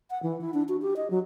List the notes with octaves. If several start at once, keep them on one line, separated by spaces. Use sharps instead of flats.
F#5
E3
E4
D4
F#4
G4
D#5
F#3